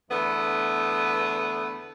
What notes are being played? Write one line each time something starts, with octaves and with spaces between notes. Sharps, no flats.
E2 D3 A3 B3